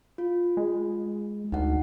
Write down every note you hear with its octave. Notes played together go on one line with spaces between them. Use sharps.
F4
G#3
D2 D#4 F#5